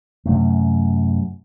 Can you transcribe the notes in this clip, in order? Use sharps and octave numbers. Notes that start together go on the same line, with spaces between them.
F#2 C3 A3